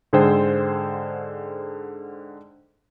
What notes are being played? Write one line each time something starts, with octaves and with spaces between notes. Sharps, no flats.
G#2 D3 G#4 A4 C5 G5